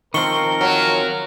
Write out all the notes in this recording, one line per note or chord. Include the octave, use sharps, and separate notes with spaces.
D#3 F3 C4 A#4 C#6 C#7 G7
F#3